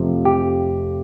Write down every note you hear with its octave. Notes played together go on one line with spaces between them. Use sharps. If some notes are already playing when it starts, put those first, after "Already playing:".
Already playing: F2 C3 F3 A3
G4